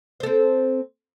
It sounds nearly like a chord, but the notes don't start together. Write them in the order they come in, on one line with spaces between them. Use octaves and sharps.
C5 A4 C4